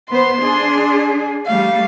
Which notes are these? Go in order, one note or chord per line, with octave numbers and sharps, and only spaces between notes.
B3 C5 C6
D4 G#4
G3 A3 F5